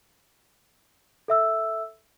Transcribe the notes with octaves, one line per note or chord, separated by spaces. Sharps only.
A4 E5 E6